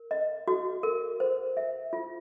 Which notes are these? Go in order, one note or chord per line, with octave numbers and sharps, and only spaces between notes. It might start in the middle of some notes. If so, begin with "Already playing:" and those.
Already playing: A#4
D#5
F#4
A#4
C5
E5
F4